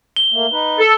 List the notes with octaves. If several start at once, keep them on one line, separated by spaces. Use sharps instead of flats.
G7
A3 A#3
D#4 B4
A4